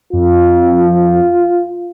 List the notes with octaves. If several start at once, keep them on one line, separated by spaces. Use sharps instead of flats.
F2 F4